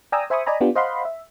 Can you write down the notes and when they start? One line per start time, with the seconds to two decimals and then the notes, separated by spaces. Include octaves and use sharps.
0.12 D5 G5 G#5 A#5 D#6 E6
0.30 C5 E5 G#5 B5 C#6 D#6
0.46 D5 D#5 G#5 A#5 B5
0.61 B3 D4 F4 G4
0.75 C5 D#5 F5 F#5 B5 C6
1.05 E5